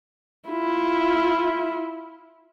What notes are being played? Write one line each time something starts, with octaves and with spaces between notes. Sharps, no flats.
E4 F4